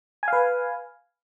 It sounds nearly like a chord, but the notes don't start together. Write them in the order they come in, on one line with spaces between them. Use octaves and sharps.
G#5 F5 B4